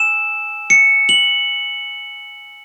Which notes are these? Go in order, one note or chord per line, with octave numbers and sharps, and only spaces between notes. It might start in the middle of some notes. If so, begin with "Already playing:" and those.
Already playing: G#5 E6 E7
C#7
F#7